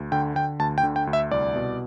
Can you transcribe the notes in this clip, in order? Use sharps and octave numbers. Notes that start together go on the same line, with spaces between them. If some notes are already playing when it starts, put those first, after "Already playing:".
Already playing: D2
D3 G5
D3 G5
D2 A5
G5
D3
G5
D2
E5
C2 D5
B2